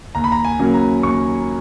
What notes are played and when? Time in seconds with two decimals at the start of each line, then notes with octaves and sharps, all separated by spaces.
0.15 D#2 A#5
0.24 B5
0.32 A#5
0.45 G#5
0.59 C#3 F#3 A#3 C#4
0.74 A#5
1.03 D#2 C#6